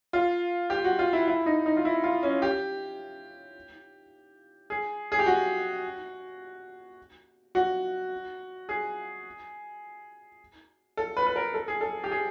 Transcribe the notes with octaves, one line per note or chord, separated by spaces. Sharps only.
F4
G4
F#4
F4
E4
E4
D#4
D#4
F4
E4
F4
C#4
G4
G#4
G#4
G4
F#4
F#4
G#4
A4
B4
B4
A#4
A4
G#4
A4
G4
G#4